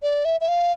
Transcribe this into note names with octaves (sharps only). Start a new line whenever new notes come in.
D5
E5
E5
F5